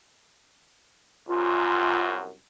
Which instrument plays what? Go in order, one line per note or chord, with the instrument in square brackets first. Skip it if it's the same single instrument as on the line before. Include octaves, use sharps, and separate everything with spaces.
[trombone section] C2 F#2 [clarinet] F4